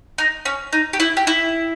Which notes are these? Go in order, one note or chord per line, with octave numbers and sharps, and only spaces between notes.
D#4
C#4
D#4
G4
E4
G4
E4